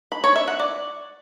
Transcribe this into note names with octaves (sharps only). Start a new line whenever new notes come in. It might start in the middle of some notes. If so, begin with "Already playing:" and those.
B5
C#5
E5
F#5
D5